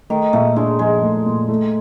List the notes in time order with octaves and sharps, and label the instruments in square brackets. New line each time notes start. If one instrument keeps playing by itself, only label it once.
[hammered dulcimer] D#3 [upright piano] A3
[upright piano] A#2 [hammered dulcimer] A3
[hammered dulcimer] G#3 [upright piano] D4
[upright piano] F3 [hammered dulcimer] G#3
[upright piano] A3
A#2
A3